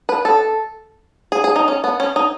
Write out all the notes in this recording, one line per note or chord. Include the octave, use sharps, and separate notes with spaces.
B4
A4
G#4
G#4
D#4
C#4
B3
C#4
D#4